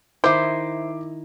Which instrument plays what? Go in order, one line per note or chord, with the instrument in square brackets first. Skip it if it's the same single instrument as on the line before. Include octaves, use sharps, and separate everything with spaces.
[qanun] D#3 E4 [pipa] C5 [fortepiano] E5 D6